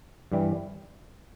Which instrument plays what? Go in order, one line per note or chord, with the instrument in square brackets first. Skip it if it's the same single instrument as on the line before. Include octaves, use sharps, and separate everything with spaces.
[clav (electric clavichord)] G2 E3 G3